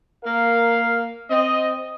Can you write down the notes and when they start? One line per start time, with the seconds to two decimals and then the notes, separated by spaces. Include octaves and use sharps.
0.24 A#3 A#4 F5
1.30 C4 D#5